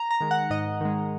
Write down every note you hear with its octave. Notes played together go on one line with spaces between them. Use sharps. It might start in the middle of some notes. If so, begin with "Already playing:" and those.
Already playing: A#5
A#5
D#3 G#3
F#5
G#2 D#5
D#3 G#3